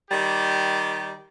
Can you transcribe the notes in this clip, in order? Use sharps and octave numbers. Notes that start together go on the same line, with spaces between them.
D#3 G3 G4